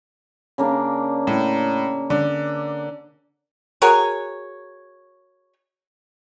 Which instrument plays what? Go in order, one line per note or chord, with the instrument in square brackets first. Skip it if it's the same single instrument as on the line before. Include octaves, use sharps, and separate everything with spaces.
[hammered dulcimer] C#3 A#3 D4
[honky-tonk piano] A2
[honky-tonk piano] D3 [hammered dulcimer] D5
[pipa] F#4 G#4 A#4 C#5